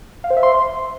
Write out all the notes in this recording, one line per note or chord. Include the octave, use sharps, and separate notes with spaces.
F5
C5
E5
C6